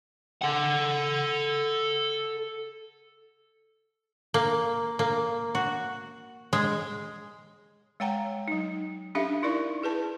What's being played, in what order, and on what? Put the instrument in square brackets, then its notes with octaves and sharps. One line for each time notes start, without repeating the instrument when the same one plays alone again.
[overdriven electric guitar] A4 F#5
[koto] A#3
A#3
F#4
G#3
[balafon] G#3 C#5 F#5 G5 A#5
F#3 D#4
C#4 D4 G4 A4 E5 F5
D#4 E4 A#4 D5 C#6
E4 G#4 B4 A5